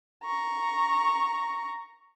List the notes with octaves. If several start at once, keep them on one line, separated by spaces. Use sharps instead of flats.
A#5 C#6